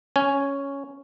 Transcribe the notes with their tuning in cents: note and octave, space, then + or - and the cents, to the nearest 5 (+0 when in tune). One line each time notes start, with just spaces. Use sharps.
C#4 +0 G#5 +0